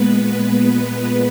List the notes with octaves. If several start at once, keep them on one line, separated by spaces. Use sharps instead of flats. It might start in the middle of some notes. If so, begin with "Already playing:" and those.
Already playing: A#2 G#3 B3 B4
B3 B4